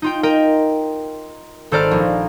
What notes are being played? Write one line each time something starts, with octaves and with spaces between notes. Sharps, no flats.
D#4 F4 G5
A#4 D#5 G5 A#5
G#1 A4 C5 D5 A#5 F6
A#1